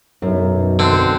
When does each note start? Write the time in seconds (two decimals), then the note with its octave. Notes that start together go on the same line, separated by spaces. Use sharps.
0.22 B1 F#2
0.79 D3 C4